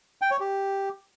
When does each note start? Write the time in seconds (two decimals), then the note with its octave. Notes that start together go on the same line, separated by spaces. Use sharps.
0.22 G5
0.31 C#5
0.40 G4